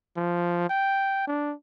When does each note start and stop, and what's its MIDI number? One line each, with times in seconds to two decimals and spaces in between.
0.16 0.67 53
0.69 1.23 79
1.27 1.54 62